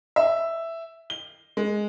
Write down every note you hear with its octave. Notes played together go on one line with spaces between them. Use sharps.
E5
G7
G#3